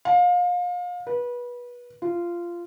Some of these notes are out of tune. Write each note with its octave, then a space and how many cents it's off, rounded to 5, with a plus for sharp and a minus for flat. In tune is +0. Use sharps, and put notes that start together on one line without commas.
F5 +30
B4 -25
F4 -15